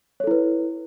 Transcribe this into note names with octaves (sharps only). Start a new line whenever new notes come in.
E4 A4 B4 C#5